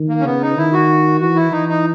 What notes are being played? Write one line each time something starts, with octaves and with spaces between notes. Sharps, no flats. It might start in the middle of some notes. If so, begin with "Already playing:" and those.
Already playing: D#3
A#3
C#4
C#3 B3
D#4
D#3 E4
F#4
E3 F#4
E4
E3 D#4
D#4